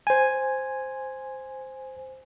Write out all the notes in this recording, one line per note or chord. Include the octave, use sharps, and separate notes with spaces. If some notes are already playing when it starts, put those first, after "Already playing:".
C5 G#5